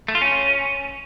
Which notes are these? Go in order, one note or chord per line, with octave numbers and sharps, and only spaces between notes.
A3
F4
C#4